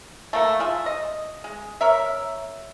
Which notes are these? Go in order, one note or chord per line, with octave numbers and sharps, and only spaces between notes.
A3 A#3 A4
F4 G#4 E5
D#5
G#3
A#4 C#5 E5